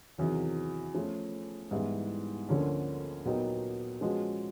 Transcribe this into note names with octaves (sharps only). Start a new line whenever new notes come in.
E2 C3 D#3 F#3
F3 A3 C#4
G#2 E3 G3 B3 E4
D2 D3 F3 A#3 C#4
A#2 F#3 B3 D#4 G4
F3 G#3 C#4 F#4 B4